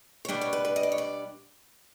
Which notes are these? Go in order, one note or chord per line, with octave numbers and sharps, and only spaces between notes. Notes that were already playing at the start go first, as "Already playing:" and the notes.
C#5
B2 G3 B3 D4 D5
C#5
B4
B4
D#5
D5
C#5
D5